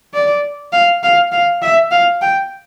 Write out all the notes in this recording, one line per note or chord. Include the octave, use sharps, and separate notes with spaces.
D5
F5
F5
F5
E5
F5
G5